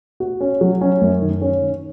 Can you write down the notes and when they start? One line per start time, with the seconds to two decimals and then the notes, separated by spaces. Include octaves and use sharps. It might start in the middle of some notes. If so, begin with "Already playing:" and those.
0.20 F#4
0.41 C#4
0.61 F#3
0.81 C#4
1.01 F#2
1.22 D#3
1.42 C#4
1.62 D#3